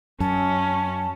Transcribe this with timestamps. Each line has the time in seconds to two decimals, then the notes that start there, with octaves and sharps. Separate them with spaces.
0.20 F#2 C#4 A5